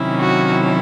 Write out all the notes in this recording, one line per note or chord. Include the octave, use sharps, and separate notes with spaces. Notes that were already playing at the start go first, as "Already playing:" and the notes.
Already playing: C3 D#3 F#3 C#4 E4
F#4
E4